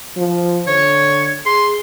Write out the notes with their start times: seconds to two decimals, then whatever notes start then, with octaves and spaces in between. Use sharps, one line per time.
0.17 F3
0.67 D3 C#5
1.46 G#4 C6